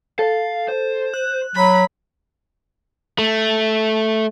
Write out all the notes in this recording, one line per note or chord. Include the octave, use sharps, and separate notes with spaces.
A4 F5
C5
F#6
F#3 B5
A3